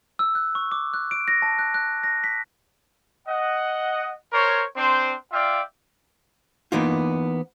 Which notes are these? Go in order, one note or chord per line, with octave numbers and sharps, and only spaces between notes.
E6
F#6
C#6
D6
F#6
D7
A#6
A5
F#6
F#6
A#6
B6
D#5 F#5
A#4 C5 C#5
C4 D4 C5
F4 D5 E5 F5 G5
E3 A#3 B3 D#4 F4